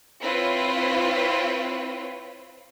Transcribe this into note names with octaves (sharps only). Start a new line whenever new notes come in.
C4 E4 F4 B4 C#5